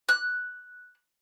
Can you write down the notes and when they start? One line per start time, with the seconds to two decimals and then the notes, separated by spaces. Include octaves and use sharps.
0.09 F#6